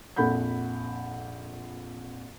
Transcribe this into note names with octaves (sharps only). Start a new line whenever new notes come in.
A#1 F2 A4 F#5 B5 G6